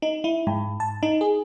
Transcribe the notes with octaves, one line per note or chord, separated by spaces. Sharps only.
D#4
E4
G#2
A5
D#4
G#4